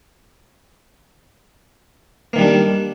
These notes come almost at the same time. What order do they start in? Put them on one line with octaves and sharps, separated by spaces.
A#3 D#3 G3 D4